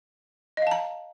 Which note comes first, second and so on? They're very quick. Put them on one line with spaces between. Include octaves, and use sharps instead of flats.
D#5 F5 A5 A#5